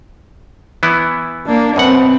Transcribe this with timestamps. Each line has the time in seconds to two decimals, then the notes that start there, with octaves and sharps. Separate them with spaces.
0.83 E3 B3 E4
1.46 A#3 D4
1.76 F#2 B2 C4 B4 F#5